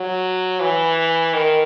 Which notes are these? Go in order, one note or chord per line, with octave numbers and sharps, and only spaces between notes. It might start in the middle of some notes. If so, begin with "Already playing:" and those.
Already playing: F#3
E3
D#3